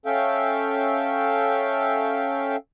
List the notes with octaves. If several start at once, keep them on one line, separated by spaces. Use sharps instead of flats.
C#4 A4 E5 F5 G5